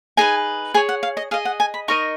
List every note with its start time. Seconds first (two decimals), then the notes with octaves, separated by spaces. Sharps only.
0.17 D#4 G#4 B4 G#5
0.74 G#4 C#5 G#5
0.89 F#5
1.03 F5
1.17 D#5
1.31 G#4 D#5 F5
1.45 F#5
1.60 G#5
1.74 B5
1.88 D#4 A#4 D#5 C#6